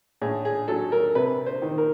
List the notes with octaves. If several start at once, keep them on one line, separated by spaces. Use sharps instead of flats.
A2 G#4
G#4
F#3 A4
A#4
C3 B4
C5
D#3
A#4